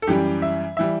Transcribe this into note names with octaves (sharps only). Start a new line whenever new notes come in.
A4
F#2 E3 G3 G4
E5
E3 G3 E5